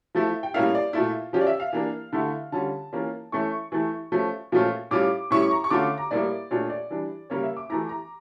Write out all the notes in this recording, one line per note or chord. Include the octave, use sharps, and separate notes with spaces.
F3 A3 E4
G5
A2 G3 A#3 C#4 E4 F5
D5
A#2 A3 E4 F4
F3 C#4 F4 G4
D5
E5
F5
E3 A#3 D4
D3 A3 E4
D3 G3 C#4 F4 A5
E3 A#3 C#4 F4
E3 A3 C#4 E4 C#6
E3 A3 E4
F3 A3 C#4
A#2 F3 A3 C#4 F4
A2 G3 C#4 F4 D6
A2 G3 C#4 E4 C#6
A#5
C#6
D3 A3 C#4 F4 D6
A#5
A2 G3 A#3 E4 D5
A#2 A3 D4 F4 C#5
D5
E3 G3 D4
C#3 G3 A#3 C#4 C#5
E5
D6
E3 A3 E4 A#5
A#5